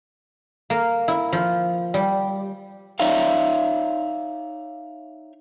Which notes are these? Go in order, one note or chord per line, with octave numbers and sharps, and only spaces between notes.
A#3
E4
F3
G3
D#4 C#5 D5 E5 F5